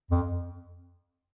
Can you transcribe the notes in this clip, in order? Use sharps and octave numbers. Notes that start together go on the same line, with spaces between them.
F2